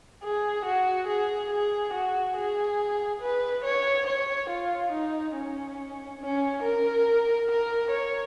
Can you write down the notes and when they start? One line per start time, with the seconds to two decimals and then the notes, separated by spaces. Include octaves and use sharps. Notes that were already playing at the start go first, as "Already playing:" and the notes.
0.23 G#4
0.65 F#4
1.08 G#4
1.51 G#4
1.93 F#4
2.36 G#4
3.22 B4
3.64 C#5
4.07 C#5
4.50 F4
4.93 D#4
5.35 C#4
6.21 C#4
6.63 A#4
7.49 A#4
7.91 C#5